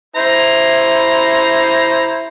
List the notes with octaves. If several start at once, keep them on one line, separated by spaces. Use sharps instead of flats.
E4 C5 A#5